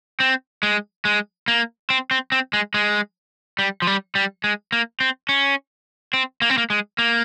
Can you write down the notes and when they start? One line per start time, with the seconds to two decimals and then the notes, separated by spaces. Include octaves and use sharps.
0.20 C4
0.63 G#3
1.05 G#3
1.48 A#3
1.90 C4
2.11 C4
2.32 C4
2.53 G#3
2.74 G#3
3.59 G3
3.82 F3
3.87 G3
4.15 G3
4.44 G#3
4.72 A#3
5.00 C4
5.29 C#4
6.13 C4
6.42 A#3
6.50 C4
6.58 A#3
6.70 G#3
6.98 A#3